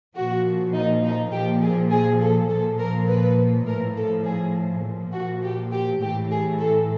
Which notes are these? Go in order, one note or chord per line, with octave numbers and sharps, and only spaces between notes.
A#2 F3 F#4
D#4
D#4
A#2 F3 G4
G#4
G#4
A4
A#2 F3 A4
A#4
B4
A2 F3 A#4
A4
G#4
A#2 F3
F#4
G4
G4
A2 E3 G4
G#4
A4